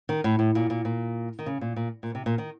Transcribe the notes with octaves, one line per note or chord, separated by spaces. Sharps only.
D#3
A2
A2
A#2
A#2
A#2
D#3
C#3
A#2
A#2
A#2
C3
A#2
D#3